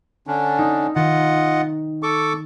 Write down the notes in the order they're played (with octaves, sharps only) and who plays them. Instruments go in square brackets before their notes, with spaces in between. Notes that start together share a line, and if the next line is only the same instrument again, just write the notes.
[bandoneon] D3 C#4 D4
[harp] D#4
[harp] D#3 [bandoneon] F4 D#5 F#5
[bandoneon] A4 C#6 D6